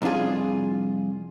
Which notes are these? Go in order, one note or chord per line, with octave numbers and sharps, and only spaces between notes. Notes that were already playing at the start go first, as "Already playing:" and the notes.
C2 F2 D4 F4 G#4